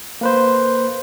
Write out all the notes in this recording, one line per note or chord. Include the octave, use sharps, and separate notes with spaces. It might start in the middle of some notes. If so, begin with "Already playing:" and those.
A#3 B4 C5